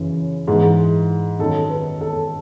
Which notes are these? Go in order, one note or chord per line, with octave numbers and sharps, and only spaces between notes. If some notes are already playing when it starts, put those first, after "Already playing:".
Already playing: F#2 C#3 E3
G#2 E3
F#2 D#3 A4
B4
A4